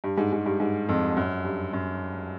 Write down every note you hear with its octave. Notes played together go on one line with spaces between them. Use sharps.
G2
G#2
G#2
G2
G#2
F2
F#2
G2
F#2